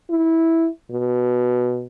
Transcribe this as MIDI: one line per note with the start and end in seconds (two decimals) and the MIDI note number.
0.10 0.68 64
0.91 1.87 47